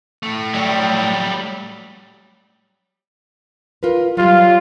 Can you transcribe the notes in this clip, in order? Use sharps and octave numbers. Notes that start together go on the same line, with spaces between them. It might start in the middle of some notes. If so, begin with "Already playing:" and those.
A2 A3
F#3 G3
F4 A#4 B4
F#3 G3 F4